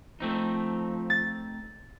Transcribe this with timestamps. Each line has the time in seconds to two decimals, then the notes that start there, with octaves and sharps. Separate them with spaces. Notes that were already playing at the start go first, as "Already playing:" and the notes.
0.20 F3 A3 C4 D#4
1.10 A6